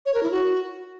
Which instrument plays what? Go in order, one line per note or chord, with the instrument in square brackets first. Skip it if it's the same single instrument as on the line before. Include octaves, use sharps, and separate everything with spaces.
[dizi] C#5
A#4
E4
F#4